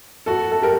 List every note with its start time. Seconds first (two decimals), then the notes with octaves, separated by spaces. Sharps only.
0.26 F#4 A4
0.51 A4
0.62 G4 A#4